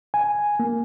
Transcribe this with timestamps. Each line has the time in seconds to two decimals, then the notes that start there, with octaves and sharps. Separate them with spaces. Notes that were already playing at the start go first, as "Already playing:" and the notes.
0.14 G#5
0.60 A#3